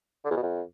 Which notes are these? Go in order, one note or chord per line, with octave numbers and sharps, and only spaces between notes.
D3
E2
B2
F2